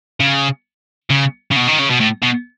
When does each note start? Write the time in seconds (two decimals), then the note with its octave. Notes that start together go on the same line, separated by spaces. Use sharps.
0.20 C#3
1.10 C#3
1.51 C#3
1.56 B2
1.67 D#3
1.79 C#3
1.90 B2
2.00 A2
2.22 B2